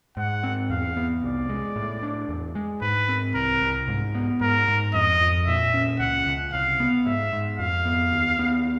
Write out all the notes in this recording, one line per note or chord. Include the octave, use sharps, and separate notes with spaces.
G#2 F#5
C4
E2 F5
B3
C2 D5
G#3
A2
D4
E2
G#3
G#2 B4
C4
C2 A#4
C2
G#2
B3
G#2 A#4
G#2
F2 D#5
F2
A#2 E5
C#4
C#2 F#5
C#2
C2 F5
B3
G#2 E5
G#2
F2 F5
B3
D#2
B3